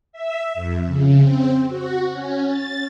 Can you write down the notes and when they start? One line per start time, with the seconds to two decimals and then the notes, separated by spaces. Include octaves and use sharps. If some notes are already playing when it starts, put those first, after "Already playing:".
0.12 E5
0.54 F2
0.87 C#3
1.20 C4
1.69 F#4
2.12 C#4
2.47 A6